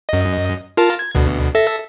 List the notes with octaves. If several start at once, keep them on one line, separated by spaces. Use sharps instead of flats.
F#2 D#5
F4 A#4 A5
G#6
D2 B2
A4 E5 A#6